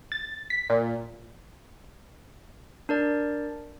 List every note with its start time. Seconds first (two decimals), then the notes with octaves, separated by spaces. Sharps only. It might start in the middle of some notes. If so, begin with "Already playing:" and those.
0.12 A6
0.50 B6
0.70 A#2
2.89 D4 A#4 D5